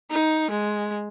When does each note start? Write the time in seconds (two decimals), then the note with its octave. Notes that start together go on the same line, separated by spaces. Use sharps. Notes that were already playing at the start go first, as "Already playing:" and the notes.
0.11 D#4
0.50 G#3